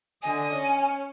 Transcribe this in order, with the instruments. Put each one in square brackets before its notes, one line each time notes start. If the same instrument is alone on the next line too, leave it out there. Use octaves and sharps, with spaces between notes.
[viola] D3 D#5 [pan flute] G#5
[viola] C#4